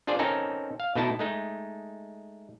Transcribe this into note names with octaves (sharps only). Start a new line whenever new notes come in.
D4 F4 G#4 C5 D5
C4 C#4 D#4 A4 A#4
F5
B2 A3 D#4 E4 A5
G#3 A3 D#4